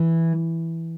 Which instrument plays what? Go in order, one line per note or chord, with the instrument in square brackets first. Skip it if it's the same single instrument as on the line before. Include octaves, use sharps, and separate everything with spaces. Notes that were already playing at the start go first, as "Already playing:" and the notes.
Already playing: [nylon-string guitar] E3